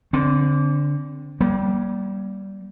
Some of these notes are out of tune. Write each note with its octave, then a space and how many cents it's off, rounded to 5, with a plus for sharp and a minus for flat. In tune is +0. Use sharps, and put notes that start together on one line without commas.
D3 -20 C4 +0
G3 -15 A#3 +30